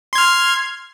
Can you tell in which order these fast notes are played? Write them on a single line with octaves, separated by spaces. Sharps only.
C6 G#6 F6